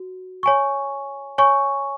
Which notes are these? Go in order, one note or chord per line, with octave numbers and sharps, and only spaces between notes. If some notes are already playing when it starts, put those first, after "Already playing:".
Already playing: F#4
C#5 G#5 C#6
C#5 G#5 C#6